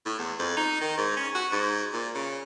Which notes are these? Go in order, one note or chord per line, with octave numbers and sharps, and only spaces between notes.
A2
E2
F2
D#4
D#3
G#2
C#4
F#4
G#2
A#2
C#3